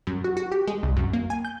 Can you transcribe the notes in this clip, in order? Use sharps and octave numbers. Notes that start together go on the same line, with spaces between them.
F#2
F#4
F#4
G4
G#3
C2
F#2
A#3
G#5
G6